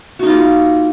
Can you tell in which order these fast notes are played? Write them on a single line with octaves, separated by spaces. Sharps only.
F#4 D#4 F4 A#3